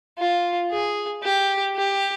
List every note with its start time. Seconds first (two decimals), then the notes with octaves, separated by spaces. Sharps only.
0.19 F4
0.71 G#4
1.23 G4
1.76 G4